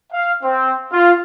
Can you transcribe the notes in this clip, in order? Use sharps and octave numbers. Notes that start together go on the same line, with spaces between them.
F5
C4
F4